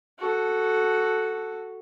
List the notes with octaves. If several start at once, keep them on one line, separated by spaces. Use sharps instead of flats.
F#4 A4